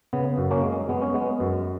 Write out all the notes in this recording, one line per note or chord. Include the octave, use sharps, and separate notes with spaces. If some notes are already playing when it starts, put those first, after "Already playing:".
C#3 B3
F#2
A#3 C#4
G#3
G#3 B3
C#4
G#3 B3
F#2